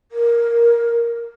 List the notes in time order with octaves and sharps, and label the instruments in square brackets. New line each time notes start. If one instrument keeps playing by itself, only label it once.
[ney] A#4